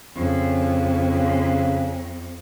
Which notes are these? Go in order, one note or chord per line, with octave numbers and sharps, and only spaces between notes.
F2 C#3